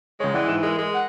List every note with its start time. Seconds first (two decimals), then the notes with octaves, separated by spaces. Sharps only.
0.20 C#2 G#3 C#5
0.34 E3 D5 F#5 G5
0.48 G#2 F#6 E7
0.63 G#3 A#4 E6
0.79 G#3
0.94 F#5